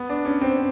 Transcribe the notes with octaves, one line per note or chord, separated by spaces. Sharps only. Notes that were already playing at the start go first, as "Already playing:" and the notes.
Already playing: B3
D4
C#4
C4